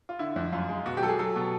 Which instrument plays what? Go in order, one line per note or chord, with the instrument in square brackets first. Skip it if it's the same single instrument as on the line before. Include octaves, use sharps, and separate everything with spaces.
[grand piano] F4
D3 E4
F2
F#2 F4
G#3
B2 F#4
G4
F#3 A4
G#4
F#3 A4
B2